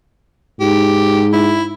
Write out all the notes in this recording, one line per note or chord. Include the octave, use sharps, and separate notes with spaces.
G#2 G4
E4